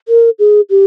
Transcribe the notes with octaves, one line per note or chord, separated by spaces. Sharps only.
A#4
G#4
G4